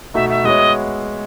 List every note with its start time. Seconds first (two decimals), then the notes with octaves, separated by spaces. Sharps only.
0.14 B2 A3 D#4 E5
0.29 E5
0.44 G#3 B3 F#4 C#5 D#5 E5